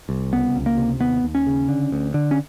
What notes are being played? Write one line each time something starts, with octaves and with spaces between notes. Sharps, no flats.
C2
C#2 B3
C#2
A#3
C3
D#2 B3
D#2
C#4
C#3
D3
D2
D3
C#4